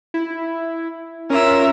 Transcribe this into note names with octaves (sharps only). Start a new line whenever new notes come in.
E4
C#4 F4 A#4 E5